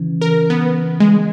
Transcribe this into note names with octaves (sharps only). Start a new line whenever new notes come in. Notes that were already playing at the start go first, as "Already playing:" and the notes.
Already playing: C#3 E3 C#4
A#4
B3
G#3